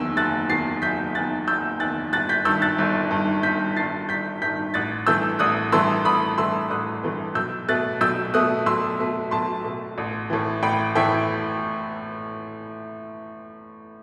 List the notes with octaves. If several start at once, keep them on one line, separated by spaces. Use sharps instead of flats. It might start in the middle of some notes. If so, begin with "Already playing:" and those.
Already playing: F#1 E2 D#3 E6
F#1 F#6 A6
E2 D#3 A6 C7
F#1 G6 B6
E2 D#3 F#6 A6
F#1 E6 G6
E2 D#3 F#6 A6
G1 F#6 A6
G6 B6
G2 D#3 E6 G6
F#6 A6
G1
G2 D#3
G1 G6 B6
G2 D#3 A6 C7
G1 G6 B6
G2 D#3 G6 B6
A1 F#6 A6
G2 E3 A3 E6 G6
A1 D#6 F#6
G2 E3 A3 C6 E6
A1 B5 D#6
G2 E3 A3 C6 E6
A1 D#6 F#6
G2 E3 A3
B1 E6 G6
B2 A3 F#6 A6
B1 E6 G6
B2 A3 D#6 F#6
B1 C6 E6
B2 A3
B1 A5 C6
B2 A3
A1
A2 E3
A1 G5 B5
A2 E3 E5 G5